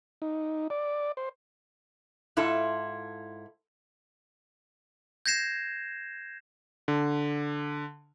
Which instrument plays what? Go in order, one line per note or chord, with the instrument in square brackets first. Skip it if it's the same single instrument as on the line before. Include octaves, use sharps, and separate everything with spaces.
[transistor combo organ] D#4
D5
C5
[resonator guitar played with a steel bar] G#2 E4 F4 A4
[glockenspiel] G6 G#6 A#6 C7 E7
[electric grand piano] D3